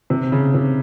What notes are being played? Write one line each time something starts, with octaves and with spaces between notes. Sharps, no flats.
C3
C#3
C3